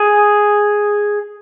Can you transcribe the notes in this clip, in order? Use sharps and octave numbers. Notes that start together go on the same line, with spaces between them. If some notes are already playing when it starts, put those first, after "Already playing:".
Already playing: G#4